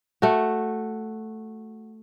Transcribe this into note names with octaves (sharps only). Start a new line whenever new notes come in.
A3 F#4